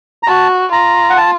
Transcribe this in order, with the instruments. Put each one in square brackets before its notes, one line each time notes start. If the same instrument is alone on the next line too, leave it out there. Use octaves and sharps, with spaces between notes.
[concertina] A#5
[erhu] F#4 [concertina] A5
[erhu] F4 [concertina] A#5
[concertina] F#5
A5